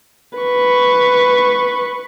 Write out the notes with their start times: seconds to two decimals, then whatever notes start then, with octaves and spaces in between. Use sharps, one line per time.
0.38 B4 C#6